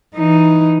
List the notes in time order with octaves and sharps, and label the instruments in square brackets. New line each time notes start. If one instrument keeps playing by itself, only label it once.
[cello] E3 D#4